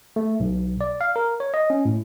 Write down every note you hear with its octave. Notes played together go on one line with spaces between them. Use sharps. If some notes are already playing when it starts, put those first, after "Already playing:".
A3
B1
D5
F5
A#4
C#5
D#5
C#4
A2